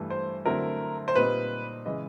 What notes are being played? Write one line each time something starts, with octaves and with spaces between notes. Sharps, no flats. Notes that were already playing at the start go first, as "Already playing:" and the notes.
Already playing: G2 E3 A3
C5
D3 F#3 A3 C4 E4 A#4
C5
A#2 G3 C4 D#4 B4
C#3 E3 G#3 D#5